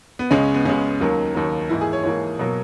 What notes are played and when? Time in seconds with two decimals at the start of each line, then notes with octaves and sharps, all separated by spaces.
0.19 B3
0.31 C#2 C#3 G#3 C#4
0.54 B3
0.65 C#2 C#3 G#3 C#4
1.00 D#2 D#3 F#3 A#3
1.35 D#2 D#3 F#3 A#3
1.69 G#2 E3 A#3 E4
1.81 G#4
1.93 C#5
2.03 G#2 E3 A#3 C#5
2.39 B2 F#3 A#3